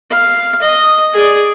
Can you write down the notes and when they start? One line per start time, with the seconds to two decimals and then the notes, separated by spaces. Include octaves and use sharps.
0.11 F5
0.61 D#5
1.13 G#4 D5